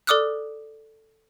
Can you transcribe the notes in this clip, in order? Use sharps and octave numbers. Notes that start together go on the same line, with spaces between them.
A4 D5 D6 D#6 F6 F#6